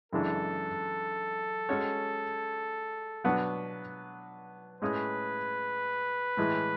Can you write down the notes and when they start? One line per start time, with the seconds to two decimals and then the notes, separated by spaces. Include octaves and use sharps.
0.12 F#2 C#3 E3 G#3 D4 A4
1.69 G#3 C#4 F#4 C#5
3.24 B2 F#3 B3 D4 F#4
4.81 A2 G#3 C#4 G#4 B4
6.37 A2 E3 G#3